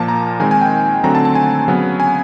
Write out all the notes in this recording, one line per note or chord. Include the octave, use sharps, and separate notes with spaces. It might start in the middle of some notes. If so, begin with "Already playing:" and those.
Already playing: A#2 F3 A#3 A5
A#5
D#3 G#3 C4 G#5
G#5
G5
D3 F#3 A3 C4 A#5
A5
A5
G#5
C#3 F#3 B3
G#5